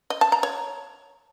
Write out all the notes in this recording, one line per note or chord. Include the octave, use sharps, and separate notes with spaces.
D#5
A5
A#5
C#5